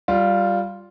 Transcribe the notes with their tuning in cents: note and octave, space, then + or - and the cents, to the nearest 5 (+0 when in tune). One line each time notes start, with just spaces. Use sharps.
G3 -10 F4 +0